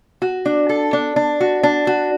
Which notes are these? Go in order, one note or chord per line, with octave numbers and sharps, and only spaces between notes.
F#4
D4
A4
D4
D4
F#4
D4
F#4